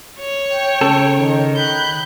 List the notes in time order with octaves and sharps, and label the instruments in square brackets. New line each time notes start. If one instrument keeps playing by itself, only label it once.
[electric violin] C#5
[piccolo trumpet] G5
[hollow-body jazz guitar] C#3 A4 A5
[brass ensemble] D#3
[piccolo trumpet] B5 [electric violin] F#6 G6